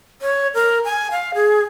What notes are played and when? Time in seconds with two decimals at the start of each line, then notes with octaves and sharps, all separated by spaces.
0.22 C#5
0.54 A#4
0.85 G#5
1.11 F5
1.34 G#4